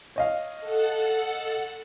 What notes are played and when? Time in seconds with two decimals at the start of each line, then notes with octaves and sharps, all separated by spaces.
0.16 C#5 D#5 F5
0.61 A4 F#5